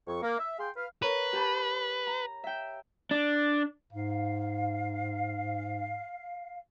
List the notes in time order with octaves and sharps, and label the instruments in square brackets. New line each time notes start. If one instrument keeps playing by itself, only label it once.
[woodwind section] F2 C#6
A#3
E5
G#4 F5 G5 C6
B4 F5
[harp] A#4 C#5 A#5 [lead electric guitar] B4
[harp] G4 A5 B5
A#5
E5 G5
[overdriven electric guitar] D4
[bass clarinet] G#2 [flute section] F5